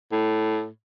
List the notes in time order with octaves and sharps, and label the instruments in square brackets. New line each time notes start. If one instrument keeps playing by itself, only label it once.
[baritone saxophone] A2